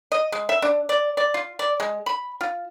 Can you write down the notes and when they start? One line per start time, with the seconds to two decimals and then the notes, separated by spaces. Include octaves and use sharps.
0.12 D#5
0.32 G#3
0.49 E5
0.62 D4
0.89 D5
1.17 D5
1.34 F4
1.59 D5
1.80 G#3
2.06 B5
2.41 F4